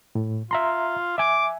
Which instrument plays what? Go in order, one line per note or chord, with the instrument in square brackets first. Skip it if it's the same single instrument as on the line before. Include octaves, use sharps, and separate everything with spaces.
[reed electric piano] A2
[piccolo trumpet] F4 [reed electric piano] E5 A#5 C6
[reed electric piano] E5 G#5 [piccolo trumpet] D6